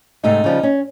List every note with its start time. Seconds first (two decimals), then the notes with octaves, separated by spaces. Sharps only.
0.24 G#2 C3 A3 D#4
0.44 C#3 F3 G3
0.63 C#4